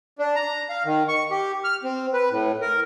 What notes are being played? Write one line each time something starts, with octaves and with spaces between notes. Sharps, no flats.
D4
A#5
F5
D#3
C#6
G4
F6
C4
B4
A2
A#4